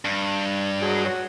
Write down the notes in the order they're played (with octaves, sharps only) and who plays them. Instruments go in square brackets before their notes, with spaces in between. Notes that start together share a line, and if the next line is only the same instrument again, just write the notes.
[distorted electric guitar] G2
[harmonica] F#3 G#3 G#4
F#4 C#5